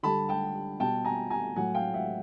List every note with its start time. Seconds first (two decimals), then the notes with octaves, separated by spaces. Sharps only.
0.03 D3 G3 A5 B5
0.29 G5 A5
0.80 B2 G3 G5 A5
1.05 G#5 A#5
1.30 G#5 A#5
1.56 A2 F#3 F#5 G#5
1.75 F5 G5
1.94 E5 F#5